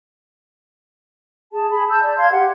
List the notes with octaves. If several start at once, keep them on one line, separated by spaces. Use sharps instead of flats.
G#4 A5
G#4 B5
A5 E6 G6
D5
F5 C6 G#6
G4 F#5